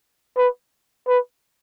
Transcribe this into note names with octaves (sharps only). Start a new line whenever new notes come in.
B4
B4